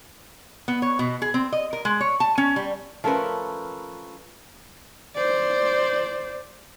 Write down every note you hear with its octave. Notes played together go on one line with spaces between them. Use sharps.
B3
C#5
B2
G#4
C4
D#5
A#4
G#3
C#5
A5
C#4
G3
F3 A3 C#4 A#4 B4
C5 D5